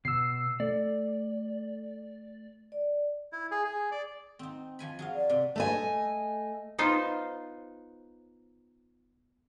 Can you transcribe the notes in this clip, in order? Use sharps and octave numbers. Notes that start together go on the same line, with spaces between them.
B2 E6 C7
A3 D5
D5
E4
G#4
G#4
D5
C4 D#4
F3 G#5 B5
F#3 G#4 F5
D5
C3
A3 D#5 G#5
B3 D#4 F4 C5